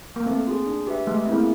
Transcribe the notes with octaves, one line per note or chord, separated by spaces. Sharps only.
A#3
A3 C4
F4 G#4
D4
G4 B4 E5
G#3 A3
B3
A#3 C4 E4 G#4